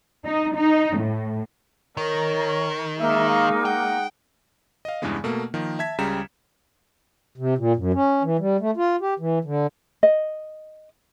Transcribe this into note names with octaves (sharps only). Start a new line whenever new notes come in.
D#4
D#4
A2
D#3 A#4 C#5
G#3 A#3 D#4 E5
F5
F#5 G5
D#5 F5
E2 G2 C#3 E3 G#3 B3
B2 A3 A#3
D#3 F3 A#3
E5 A5 G#6 B6
C#2 C#3 G3 A#5 E7
C3
A#2
F#2
C#4
E3
G3
A3
F4
G4
E3
D3
D#5